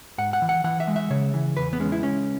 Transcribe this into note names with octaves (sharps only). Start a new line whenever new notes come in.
G#2 F#5
F#5
E3
F#5
E3 F#5
E5
G#3
E5
C#3 C#5
E3
E2 B4
B3
G#3 C#4
E4
C#2 C#4